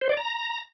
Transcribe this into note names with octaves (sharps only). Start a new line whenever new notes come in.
C5
D5
A#5